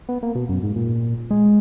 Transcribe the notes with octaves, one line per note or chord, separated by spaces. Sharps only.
B3
A#3
B2
F#2
G#2
A#2
G#3